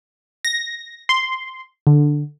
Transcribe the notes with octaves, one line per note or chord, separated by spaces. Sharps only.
A#6
C6
D3